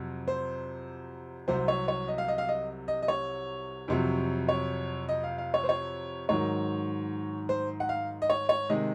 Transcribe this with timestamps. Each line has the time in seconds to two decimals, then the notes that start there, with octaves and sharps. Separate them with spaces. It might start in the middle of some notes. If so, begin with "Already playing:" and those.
Already playing: F2 C3 F#3
0.28 C5
1.48 C2 C3 F#3 C5
1.68 C#5
1.88 C#5
2.08 D#5
2.18 F5
2.28 D#5
2.38 F5
2.49 D#5
2.88 D#5
3.02 D#5
3.08 C#5
3.88 F2 C3 F#3
4.49 C#5
5.09 D#5
5.24 F5
5.38 F5
5.54 C#5
5.64 C5
5.69 C#5
6.29 G#2 D#3 F#3 C#5
7.49 C5
7.80 F#5
7.89 F5
8.22 D#5
8.30 C#5
8.49 C#5
8.69 C3 D#3 G#3 D#5